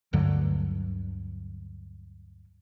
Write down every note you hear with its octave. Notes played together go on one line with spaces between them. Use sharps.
D2 G2 D3 F#3